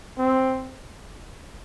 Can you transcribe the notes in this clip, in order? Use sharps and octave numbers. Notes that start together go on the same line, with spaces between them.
C4